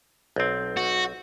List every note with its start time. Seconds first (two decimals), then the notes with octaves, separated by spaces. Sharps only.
0.36 B1 C4
0.77 F#4